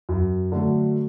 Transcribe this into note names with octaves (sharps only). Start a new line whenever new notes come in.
F#2
D3 F#3 A3